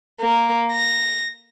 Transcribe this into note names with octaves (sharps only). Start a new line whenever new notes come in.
A#3
A#6